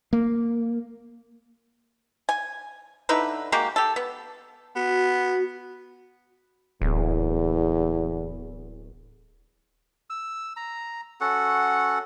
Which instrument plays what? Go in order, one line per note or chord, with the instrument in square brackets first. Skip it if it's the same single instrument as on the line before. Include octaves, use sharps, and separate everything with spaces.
[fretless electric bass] A#3
[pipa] G#5
D3 D#4 E4 B4
G#3 A#3 F#4 G4
G4 A4
B3
[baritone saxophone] B3 [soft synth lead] F#4
[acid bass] D1 [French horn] E2
[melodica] E6
A#5
C#4 F#4 A4 F#5